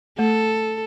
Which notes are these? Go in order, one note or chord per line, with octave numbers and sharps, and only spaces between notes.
A3 A4